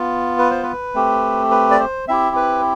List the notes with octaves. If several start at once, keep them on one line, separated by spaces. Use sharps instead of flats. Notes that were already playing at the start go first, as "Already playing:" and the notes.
Already playing: B3 F4
B4
C5
B4
A3 C4 G4
B4
D5
C5
C4 E4 G4 E5
B4